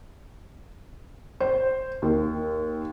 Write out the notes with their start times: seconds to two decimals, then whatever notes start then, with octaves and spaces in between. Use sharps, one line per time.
1.40 C5
2.02 D#2